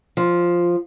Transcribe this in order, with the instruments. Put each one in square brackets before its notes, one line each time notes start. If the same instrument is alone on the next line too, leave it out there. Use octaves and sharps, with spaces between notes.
[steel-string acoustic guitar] F3